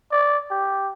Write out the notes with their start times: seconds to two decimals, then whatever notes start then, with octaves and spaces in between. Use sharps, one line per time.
0.12 D5
0.51 G4